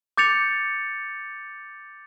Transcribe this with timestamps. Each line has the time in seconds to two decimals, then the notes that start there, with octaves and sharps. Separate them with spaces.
0.17 D6 G6 A6 C#7 F7